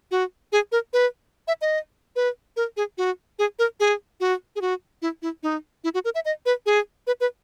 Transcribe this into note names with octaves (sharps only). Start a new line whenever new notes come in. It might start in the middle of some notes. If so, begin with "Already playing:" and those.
F#4
G#4
A#4
B4
E5
D#5
B4
A#4
G#4
F#4
G#4
A#4
G#4
F#4
G#4
F#4
E4
E4
D#4
E4
F#4
A#4
E5
D#5
B4
G#4
B4
B4